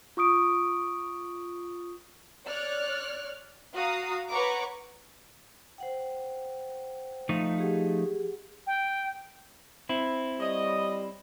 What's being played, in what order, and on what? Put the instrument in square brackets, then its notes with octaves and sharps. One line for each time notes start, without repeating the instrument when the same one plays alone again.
[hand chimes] F4 C#6 D#6 D7
[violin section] C#5 D5 F6 F#6
F#4 F5 A#5 D#6
B4 C#5 F#5 A#5 C#6 D6
[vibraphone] C5 F#5 G5
[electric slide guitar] F3 A3 D#4
[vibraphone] G4 G#4 F#5
[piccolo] G5
[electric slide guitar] C4 E4
[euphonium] G3 [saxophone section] C#5 D#5